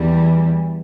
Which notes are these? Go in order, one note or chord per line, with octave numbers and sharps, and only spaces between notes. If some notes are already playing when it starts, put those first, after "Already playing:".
Already playing: E2 E3 G3